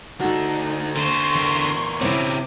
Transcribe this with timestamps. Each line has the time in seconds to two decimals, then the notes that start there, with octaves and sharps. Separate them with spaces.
0.20 D2 D4 D#4 F#4 A4
0.97 D3 C5 C6 C#6
1.35 E2 A#4
2.01 C#3 C4 E4 C5 C#5 D6